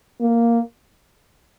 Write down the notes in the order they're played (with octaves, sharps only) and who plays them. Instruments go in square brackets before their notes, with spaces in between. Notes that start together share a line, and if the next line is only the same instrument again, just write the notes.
[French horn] A#3